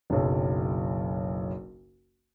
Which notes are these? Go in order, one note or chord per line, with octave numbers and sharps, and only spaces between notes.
F#1 B1